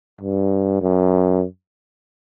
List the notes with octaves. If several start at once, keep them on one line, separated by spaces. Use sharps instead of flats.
G2
F#2